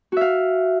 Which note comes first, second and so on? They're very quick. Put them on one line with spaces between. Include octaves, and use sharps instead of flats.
F#4 E5 F5